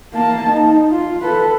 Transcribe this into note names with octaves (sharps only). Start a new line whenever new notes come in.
A#3 A5
D#4
F4
A4 B4